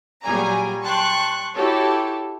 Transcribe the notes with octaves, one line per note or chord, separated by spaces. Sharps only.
A#2 F#3 G3 G#4 G#5 A#5
G5 A5 C6 C#6 F#6
E4 F#4 G4 A4 C#5